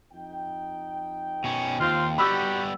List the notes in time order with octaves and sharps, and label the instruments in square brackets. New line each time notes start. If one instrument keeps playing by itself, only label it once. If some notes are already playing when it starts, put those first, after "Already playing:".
[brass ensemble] F2 D#4 G5
[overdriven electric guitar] B2 C#4
[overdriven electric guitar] D#2 [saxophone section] C4 F4
[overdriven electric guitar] G3 B3 [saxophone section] F#4 G4 [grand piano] B5 E6